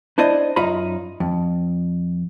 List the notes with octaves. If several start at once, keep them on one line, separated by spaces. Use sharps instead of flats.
D4 E4 C5 D5 D#5
F#2 D#4 F4 A#5 B5
F2